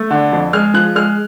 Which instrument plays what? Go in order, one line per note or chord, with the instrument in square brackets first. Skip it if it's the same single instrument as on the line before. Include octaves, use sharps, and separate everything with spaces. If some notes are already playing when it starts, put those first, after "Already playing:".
Already playing: [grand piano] A3
D3
F2
G#3 F6
F3 F#6
G#3 F6